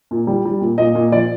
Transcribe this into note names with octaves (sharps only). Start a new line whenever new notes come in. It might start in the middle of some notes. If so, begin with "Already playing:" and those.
A#2
G3
G3
A#2
A#2 D#5
A#2
F3 D5